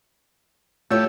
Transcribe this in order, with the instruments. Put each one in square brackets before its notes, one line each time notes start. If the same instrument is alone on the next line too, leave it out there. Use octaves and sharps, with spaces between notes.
[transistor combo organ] A3 E4 G4 [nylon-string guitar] F4 C#5